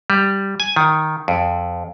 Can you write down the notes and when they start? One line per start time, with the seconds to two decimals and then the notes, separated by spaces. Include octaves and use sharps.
0.10 G3
0.60 G#5
0.76 D#3
1.28 F2